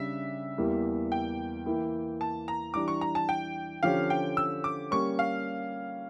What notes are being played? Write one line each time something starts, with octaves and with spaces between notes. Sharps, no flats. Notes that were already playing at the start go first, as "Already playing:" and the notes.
Already playing: C#3 G3 D4 E5
E2 E3 G3 A#3
G5
E3 A#3 E4
A5
A#5
E3 G3 D4 D6
C#6
A#5
A5
G5
D3 F3 C#4 G4 C#5 F5
G5
E6
D6
G3 A#3 C#4 C#6
F5